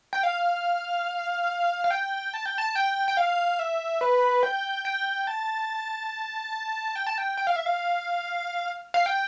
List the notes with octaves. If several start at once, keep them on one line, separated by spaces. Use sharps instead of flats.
G5
F5
F5
G5
A5
G5
A5
G5
G5
F5
E5
B4
G5
G5
A5
G5
A5
G5
G5
F5
E5
F5
F5
G5